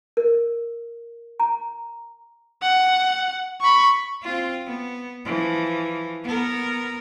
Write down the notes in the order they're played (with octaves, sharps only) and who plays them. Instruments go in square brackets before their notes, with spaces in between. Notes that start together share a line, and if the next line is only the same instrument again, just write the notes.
[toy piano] A#4
A#5
[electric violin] F#5
B5 C#6
[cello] C4 F4
B3
E3 F3
B3 A#4